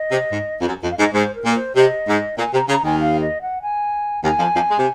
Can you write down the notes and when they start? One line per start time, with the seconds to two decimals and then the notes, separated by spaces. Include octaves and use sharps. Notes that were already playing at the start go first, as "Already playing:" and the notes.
Already playing: D#5
0.12 C3
0.32 G#2
0.61 F2
0.68 F#2
0.83 F2 D#5
0.91 F5
0.98 G#2 D#5
1.14 G#2 C5
1.35 A#4
1.45 A#2
1.55 C5
1.76 C3 D#5
2.08 G#2
2.38 A#2 G#5
2.54 C3 A#5
2.69 C#3 A#5
2.84 D#2 D#3 G#5
3.00 F5
3.21 D#5
3.42 F#5
3.62 G#5
4.24 D#2 D#3 G#5
4.40 F2 F3
4.55 F2 F3
4.71 G#3
4.79 C3